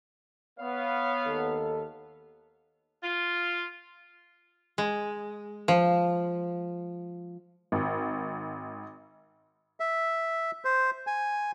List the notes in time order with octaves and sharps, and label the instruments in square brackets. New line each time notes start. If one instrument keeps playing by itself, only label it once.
[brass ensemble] B3 C#5 F5
[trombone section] D#2 D#4 A4
[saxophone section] F4
[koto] G#3
F3
[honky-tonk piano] G#1
[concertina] E5
C5
G#5